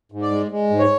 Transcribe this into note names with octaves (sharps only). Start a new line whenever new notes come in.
G#2
D5
G#3
G#3
G#2
C#5